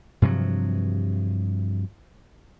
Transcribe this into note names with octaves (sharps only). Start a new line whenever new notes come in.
G2 C3 F3 F#3